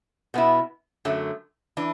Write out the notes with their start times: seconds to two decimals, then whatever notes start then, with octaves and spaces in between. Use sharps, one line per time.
0.34 B2 B3 E4
1.05 F#2 D3 F#3 A3
1.77 E3 D4